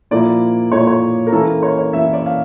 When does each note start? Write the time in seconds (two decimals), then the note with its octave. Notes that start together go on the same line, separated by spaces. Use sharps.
0.11 A#2 F3 A#3 E4 D5
0.72 A#2 F3 A#3 E4 C#5
0.80 D5
0.87 C#5
1.27 A#4
1.32 E3 A#3 C#4 E4 A4
1.47 A#4
1.63 C#5
1.78 C#5
1.93 E3 A#3 C#4 E4 E5
2.13 D5
2.26 F5